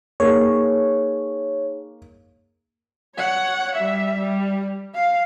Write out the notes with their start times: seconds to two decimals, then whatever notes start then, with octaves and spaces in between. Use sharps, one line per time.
0.20 A#3 D#4 G#4 C#5
3.16 C#5 F#5
3.75 G3 E5
4.18 G3
4.95 F5